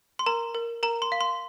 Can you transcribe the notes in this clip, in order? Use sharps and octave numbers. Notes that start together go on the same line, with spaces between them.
C6
A#4 A#5
A#4
A#4 A#5
C6
F5
C6